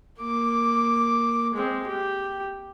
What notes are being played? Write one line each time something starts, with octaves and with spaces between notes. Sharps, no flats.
A#3 D6
G#3 C4
G4